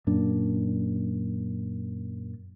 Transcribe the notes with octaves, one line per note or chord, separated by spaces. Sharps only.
F#2 A#2 D4